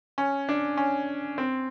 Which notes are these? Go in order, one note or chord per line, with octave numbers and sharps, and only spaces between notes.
C#4
D4
C#4
C4